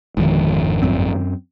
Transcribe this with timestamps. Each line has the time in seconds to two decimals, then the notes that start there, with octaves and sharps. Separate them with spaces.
0.17 G#1 F2 G#2 B2 D3 D#3
0.82 F#2 C4